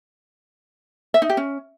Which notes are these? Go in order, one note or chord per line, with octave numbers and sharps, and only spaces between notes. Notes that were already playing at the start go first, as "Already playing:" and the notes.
E5
D#4
G4
C#4